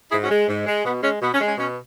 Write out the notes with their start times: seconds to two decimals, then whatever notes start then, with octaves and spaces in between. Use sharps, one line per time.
0.12 G#2 E4 G#4
0.24 C#4 F#4
0.30 G#3
0.48 G#2
0.66 G#3
0.85 B2 B3
1.03 G#3 C#4
1.21 B2 B3
1.34 C#4
1.41 G#3
1.46 C#4
1.58 B2 C#4